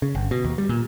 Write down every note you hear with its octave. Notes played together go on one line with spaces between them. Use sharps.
C#3
G1
B2
D#2
G3
A#2